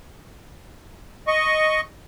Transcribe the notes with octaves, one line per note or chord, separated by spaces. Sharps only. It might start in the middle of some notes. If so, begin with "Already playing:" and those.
D#5 C#6